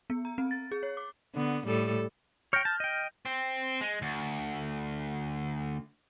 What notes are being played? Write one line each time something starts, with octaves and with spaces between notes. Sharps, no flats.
B3
A#5
C4
A6
G#4
C#5
D6
D3 B3
A2 G3 A4
C#5 G5 F6 G6 A#6
A5
D#5 G5
C4
G#3
D2